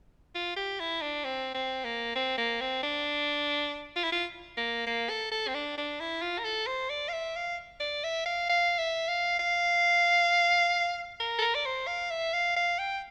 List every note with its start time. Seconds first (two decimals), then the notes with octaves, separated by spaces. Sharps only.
0.35 F4
0.57 G4
0.80 E4
1.02 D4
1.25 C4
1.55 C4
1.85 A#3
2.16 C4
2.38 A#3
2.61 C4
2.83 D4
3.96 F4
4.04 E4
4.12 F4
4.57 A#3
4.86 A#3
5.10 A4
5.32 A4
5.48 C4
5.55 D4
5.78 D4
6.00 E4
6.22 F4
6.39 A#4
6.45 A4
6.67 C5
6.90 D5
7.09 F5
7.13 E5
7.36 F5
7.80 D5
8.04 E5
8.26 F5
8.49 F5
8.79 E5
9.08 F5
9.39 F5
11.20 A#4
11.39 A4
11.42 A#4
11.55 D5
11.66 C5
11.87 F5
12.11 E5
12.33 F5
12.56 F5
12.79 G5